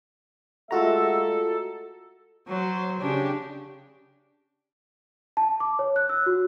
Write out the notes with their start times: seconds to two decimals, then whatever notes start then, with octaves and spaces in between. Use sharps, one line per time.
0.71 G#3 A3 F4 F#4 A4 E5 A#5
2.48 F#3 C5
2.99 C#3 D4 G4
5.37 A5
5.60 D6
5.79 C#5
5.96 F#6
6.09 E6
6.26 F#4